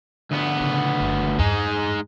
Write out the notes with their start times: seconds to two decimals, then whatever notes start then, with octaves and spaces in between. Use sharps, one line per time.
0.31 D2 B3
0.59 A2 C#3
1.00 F#1
1.39 E2 G2 G#3 D#4